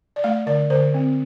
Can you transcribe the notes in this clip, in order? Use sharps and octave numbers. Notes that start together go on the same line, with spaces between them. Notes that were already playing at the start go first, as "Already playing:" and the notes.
D5
A3 F5
D3 D5
D3 C5
C4